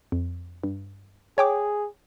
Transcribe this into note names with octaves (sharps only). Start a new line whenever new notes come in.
F2
G2
G#4 C#5 G5 D6